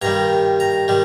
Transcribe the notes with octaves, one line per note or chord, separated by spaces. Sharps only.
G2 D#3 G3 A#5
A#5
D#3 G3